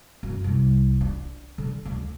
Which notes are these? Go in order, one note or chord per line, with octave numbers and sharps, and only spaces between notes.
F#2
C2
D4
D3
D2